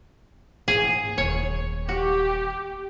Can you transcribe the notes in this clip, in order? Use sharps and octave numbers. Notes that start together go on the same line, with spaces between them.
G#2 D4 G#4
D#1 D#3 C#5
F#4 G4